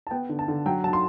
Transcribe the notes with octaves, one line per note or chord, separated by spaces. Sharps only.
A5
B3 G5
D3
A5
D3
F#3 G5
F#3 A5
C6